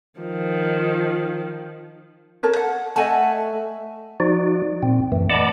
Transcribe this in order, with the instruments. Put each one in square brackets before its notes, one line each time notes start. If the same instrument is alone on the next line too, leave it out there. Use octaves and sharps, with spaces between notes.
[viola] D#3 F3
[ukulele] A4 A#4 C#5
F#5
[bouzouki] A3 E5 F#5 [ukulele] D#5 G#5 A5
[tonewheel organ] F3 D#4 F#4 D5
A#2 C4
F#2 E3 A3
D5 D#5 F#5 A5 B5 D6